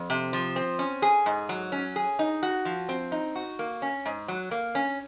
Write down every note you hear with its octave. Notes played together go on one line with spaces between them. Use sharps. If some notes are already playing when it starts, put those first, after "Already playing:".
Already playing: F2
C3
F3
C4
C#4
G#4
G#2
F#3
C#4
G#4
D#4
F#4
F3
C4
D#4
F#4
A#3
C#4
G#2
F#3
A#3
C#4